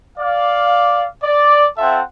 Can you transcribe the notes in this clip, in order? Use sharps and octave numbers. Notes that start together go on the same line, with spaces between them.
D5 F5
D5
C4 F4 A4 E5 F#5